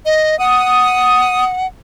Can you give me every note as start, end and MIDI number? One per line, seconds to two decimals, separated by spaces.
0.06 0.38 75
0.39 1.66 78
0.39 1.44 87